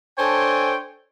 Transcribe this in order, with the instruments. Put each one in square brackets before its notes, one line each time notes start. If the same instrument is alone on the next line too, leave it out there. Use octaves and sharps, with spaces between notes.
[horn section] D4 A4 C5 C#5 G5 G#5